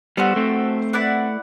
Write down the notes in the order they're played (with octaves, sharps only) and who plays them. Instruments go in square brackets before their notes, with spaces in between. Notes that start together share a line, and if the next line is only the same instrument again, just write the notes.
[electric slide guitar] G3 B3 [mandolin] F#4 A4 C5
[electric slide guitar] A3 C4
[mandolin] E4 B4 D5 F#5